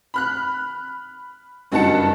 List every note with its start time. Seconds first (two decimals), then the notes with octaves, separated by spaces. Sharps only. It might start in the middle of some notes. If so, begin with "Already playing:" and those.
0.14 B5 F6 F#6
1.72 F#1 G2 D#4 F#4 A5 C#7